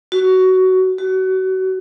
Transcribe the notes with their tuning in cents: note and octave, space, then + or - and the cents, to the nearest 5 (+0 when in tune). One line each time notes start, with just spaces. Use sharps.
F#4 +15
F#4 +30